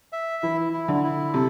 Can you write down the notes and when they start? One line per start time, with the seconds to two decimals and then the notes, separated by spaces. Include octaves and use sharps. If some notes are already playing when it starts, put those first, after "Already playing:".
0.13 E5
0.43 E3 E4
0.73 E4
0.88 D3
1.04 E4
1.34 C3 A4